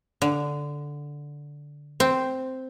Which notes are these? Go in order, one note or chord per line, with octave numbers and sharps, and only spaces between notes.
D3
C4